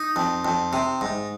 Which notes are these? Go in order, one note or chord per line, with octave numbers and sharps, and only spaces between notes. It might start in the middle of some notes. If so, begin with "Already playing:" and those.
Already playing: D#4
F2
F2
C3
G#2